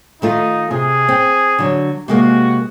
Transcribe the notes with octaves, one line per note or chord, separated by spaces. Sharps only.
D#3 A3 D#4 F4
C3 G#4
C4
D3 F#3
C3 G#3 A#3 F#4